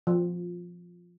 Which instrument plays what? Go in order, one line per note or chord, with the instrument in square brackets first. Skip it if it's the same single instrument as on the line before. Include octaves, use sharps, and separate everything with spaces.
[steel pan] F3